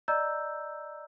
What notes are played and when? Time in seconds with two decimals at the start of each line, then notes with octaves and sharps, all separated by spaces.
0.08 D5 D#5 A#5 E6 G6